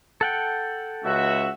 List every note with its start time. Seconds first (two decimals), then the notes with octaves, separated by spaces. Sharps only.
0.21 A4 F#5 G5
1.03 C#2 F#4 E5